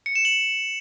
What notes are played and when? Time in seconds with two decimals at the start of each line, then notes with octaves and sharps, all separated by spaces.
0.06 C#7
0.16 E7
0.25 F#7